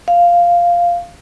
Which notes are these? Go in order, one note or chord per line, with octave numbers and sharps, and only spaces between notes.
F5